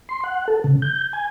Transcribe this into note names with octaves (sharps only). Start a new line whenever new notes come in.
C6
F#5
A4
C#3
G6
G#5